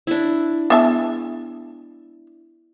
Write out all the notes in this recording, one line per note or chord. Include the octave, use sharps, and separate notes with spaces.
D4 E4
G#3 B3 E5 A5